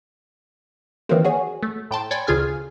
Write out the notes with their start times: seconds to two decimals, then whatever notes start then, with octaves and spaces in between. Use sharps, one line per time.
1.09 D#3 E3 F#3 A#3 C4
1.24 F#4 G#4 C#5
1.63 A3
1.91 A2 G5 A5 C6
2.11 C#5 D5 G5 G#5 B5 C6
2.27 D2 C#3 F4 G#4 G#5 F6